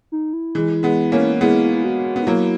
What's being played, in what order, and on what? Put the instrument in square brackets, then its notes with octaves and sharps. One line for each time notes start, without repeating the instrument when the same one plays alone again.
[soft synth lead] D#4
E4
[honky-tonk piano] E3 G#3
G#3 B3
A#3 C#4
[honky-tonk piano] G#3 B3 [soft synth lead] E4
[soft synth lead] E4
F#4
[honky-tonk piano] B3
[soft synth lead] D#4
[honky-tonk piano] F#3 A#3 [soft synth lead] E4